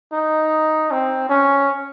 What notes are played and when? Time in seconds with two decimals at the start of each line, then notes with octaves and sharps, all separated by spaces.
0.13 D#4
0.91 C4
1.29 C#4